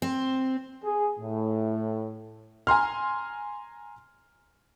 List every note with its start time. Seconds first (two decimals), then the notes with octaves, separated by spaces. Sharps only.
0.02 C4
0.84 G#4
1.20 A2
2.67 G#5 A#5 C6 F6